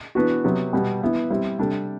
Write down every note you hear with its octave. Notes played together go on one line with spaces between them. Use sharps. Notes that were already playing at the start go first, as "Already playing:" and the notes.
E3 B3 D4 F#4 B4
C3 F#3 B3
B2 G3 B3
E3 B3 E4 B4
G3 C4 E4
C3 G3 D4 A4